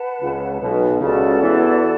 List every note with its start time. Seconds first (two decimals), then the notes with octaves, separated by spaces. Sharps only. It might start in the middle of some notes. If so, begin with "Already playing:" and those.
Already playing: B4 F#5 A5
0.22 C#2 C#3
0.62 B1 B2
1.01 C#2 C#3 F#4 A4 D5 A5
1.40 E2 E3